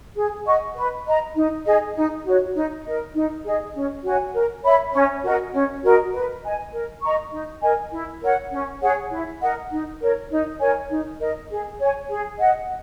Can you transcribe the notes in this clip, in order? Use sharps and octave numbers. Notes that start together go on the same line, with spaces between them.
G#4
D#5 F#5 C#6
B4
D#5 A#5
D#4
G#4 D#5
D#4
F#4 C#5
D#4
A#4 D#5
D#4
G#4 D#5
C#4
F#4 C#5 G#5
A#4
C#5 E5 B5
C#4
F#4 A#4 D#5
C#4
F#4 A#4 D#5
B4
D#5 G#5
A#4
D#5 A#5 C#6
D#4
A#4 D#5 G#5
E4
A#4 C#5 F#5
C#4
G#4 C#5 F#5
E4
A#4 D#5 F#5
D#4
A#4 C#5
D#4
A#4 C#5 G#5
D#4
A#4 D#5
G#4
C#5 G#5
G#4
D#5 F#5